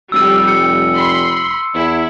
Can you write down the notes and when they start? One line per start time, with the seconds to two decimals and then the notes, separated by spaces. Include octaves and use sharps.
0.12 F1 G3 E6 D#7
0.48 C#7
0.94 B5 C6
1.74 E2 E4